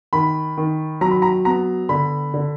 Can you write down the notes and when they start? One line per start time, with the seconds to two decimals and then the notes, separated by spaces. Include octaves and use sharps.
0.13 D#3 B5
0.57 D#3
1.01 F#3 A#5
1.11 B5
1.22 A#5
1.45 B3 A#5
1.89 D3 B5
2.34 D3